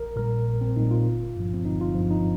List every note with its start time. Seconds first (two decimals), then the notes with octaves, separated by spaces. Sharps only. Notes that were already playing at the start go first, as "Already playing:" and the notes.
Already playing: A#1 A#4
0.16 A#2 G3 A#4
0.47 A#1
0.61 C4
0.76 A#2 G3 D#4
0.91 F4
1.06 G1
1.36 G2 F3
1.54 C4
1.65 G1 D#4
1.81 F4
1.95 G2 F3
2.11 D#4